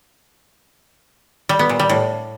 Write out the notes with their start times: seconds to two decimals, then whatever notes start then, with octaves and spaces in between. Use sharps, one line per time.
1.49 G3
1.59 B3
1.69 A#2
1.79 G3
1.89 A2